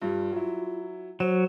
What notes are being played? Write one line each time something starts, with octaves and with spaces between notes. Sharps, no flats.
G2 G3 F4
F#3 E4
F#3 C5 E7